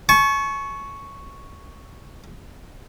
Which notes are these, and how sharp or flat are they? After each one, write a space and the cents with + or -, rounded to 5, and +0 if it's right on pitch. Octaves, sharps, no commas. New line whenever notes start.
A5 -45 C#6 +0